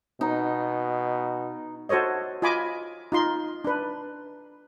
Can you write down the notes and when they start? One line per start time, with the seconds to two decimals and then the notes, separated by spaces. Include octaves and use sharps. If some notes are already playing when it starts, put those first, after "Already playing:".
0.21 B2 D#4
1.89 F#4 A4 C5 C#5 D#5
2.42 F4 D#5 G#5 B5 D6
3.12 D#4 F4 C6
3.64 D4 B4